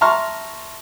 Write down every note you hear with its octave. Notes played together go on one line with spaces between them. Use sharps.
E5 A5 A#5 C6 C#6 F6